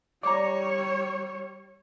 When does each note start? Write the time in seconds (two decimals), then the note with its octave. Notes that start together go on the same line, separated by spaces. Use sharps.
0.23 G3 C#5 D5 A#5